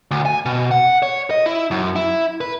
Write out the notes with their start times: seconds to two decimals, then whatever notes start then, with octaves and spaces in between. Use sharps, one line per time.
0.11 D2
0.26 G#5
0.45 B2
0.71 F#5
1.03 C#5
1.31 D#5
1.46 E4
1.71 F#2
1.96 E4
2.41 B4